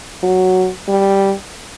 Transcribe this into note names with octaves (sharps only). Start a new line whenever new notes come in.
F#3
G3